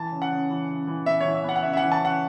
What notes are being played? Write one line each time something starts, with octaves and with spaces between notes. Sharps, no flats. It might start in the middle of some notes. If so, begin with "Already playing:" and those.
Already playing: E3 A5
C#3
F#5
C#3
E3
C#3
E3
B3 E5
E3 C#5
E5
B3 F#5
F#5
C#3 E5
E5
E3 F#5
A5
C#3 F#5